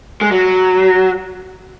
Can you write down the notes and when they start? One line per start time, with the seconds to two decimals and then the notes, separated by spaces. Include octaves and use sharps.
0.21 G#3
0.32 F#3